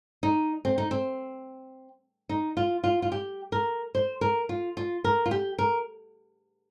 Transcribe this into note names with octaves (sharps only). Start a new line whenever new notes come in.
D#4
C4
D#4
C4
D#4
F4
F4
F4
G4
A#4
C5
A#4
F4
F4
A#4
F4
G4
A#4